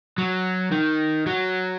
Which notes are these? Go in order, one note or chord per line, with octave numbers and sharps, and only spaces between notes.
F#3
D#3
F#3